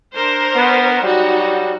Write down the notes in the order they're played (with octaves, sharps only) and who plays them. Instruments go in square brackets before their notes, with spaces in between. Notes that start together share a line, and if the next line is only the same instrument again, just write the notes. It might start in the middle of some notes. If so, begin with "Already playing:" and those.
[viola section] D4 A#4 C5
[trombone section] B3
[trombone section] F#3 G3 [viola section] D#4 F#4